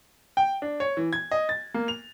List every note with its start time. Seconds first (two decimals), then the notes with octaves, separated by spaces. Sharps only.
0.37 G5
0.62 D4
0.80 C#5
0.97 E3
1.13 G#6
1.31 D#5
1.49 A6
1.74 A#3
1.88 F7